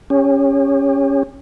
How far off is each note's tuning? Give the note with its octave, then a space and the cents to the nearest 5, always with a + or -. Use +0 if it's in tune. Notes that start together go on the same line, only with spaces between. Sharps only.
C#4 +0 G4 +45